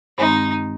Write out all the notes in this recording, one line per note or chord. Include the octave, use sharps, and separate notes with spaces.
G2 D#3 G#3 C4 D#4